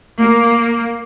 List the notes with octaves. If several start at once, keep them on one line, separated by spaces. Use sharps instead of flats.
A#3